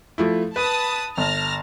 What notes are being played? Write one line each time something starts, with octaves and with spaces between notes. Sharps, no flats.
F3 A3 E4
B4 A5 B5 D#6
G1 A5 F6 A#6